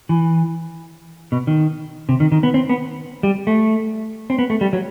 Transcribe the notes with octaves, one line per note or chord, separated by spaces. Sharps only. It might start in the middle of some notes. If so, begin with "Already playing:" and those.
E3
B2
D#3
C3
D#3
D#3
B3
C4
B3
G3
A3
C4
B3
A3
G3
F#3